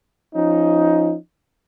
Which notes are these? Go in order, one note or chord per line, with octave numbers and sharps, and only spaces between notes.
F3 C#4 D#4